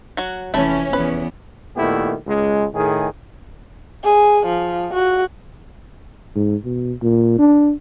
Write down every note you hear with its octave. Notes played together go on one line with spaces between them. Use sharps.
F#3 F#4
F1 E3 A3 C#4 B5
E2 B3 B4
A#2 D#3 A3 B3 E4 G4
C#2 G#3
A2 D#3 G#4
G#4
F3
F#4
G#2
B2
A#2
D4